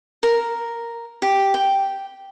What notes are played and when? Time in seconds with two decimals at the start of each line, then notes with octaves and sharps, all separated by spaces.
0.23 A#4
1.22 G4
1.54 G5